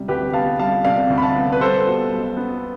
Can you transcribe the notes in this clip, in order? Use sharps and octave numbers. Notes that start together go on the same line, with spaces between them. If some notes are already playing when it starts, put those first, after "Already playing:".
Already playing: C3 G3
D2 G4 B4
B3 F5 A5
G3 F5 A5
C3 D5 F5
D2
B5
F5 A5
B3
B4
G3 A4 C5
B2
B1
B3